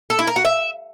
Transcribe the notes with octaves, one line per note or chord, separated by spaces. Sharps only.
A4
E4
A#4
F#4
E5